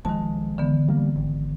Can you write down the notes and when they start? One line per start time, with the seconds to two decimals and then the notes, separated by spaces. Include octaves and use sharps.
0.05 B1 D#3 F3 G#3 A5
0.58 D3 E3 B3
0.88 G3 A#3
1.16 G#1